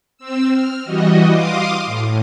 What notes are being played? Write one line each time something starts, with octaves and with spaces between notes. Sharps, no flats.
C4 E6
F6
E3 G3 F#4 D#5
F5 C6 D6 D#6
A2